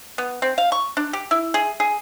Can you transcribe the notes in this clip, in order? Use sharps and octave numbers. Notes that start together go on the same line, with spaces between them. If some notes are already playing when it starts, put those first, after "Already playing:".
B3
C4
F5
C#6
D4
G4
E4
G#4
G#4